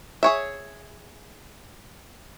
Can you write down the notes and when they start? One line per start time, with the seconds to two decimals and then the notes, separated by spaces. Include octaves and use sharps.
0.23 G#4 C#5 E5